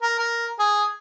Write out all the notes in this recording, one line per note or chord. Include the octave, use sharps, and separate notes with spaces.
A#4
A#4
G#4